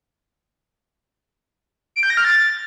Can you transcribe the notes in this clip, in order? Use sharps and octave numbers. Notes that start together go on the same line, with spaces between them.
D7
G6
A#6
F6
A6